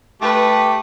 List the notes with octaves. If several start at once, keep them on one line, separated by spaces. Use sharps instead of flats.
A3 G4 B4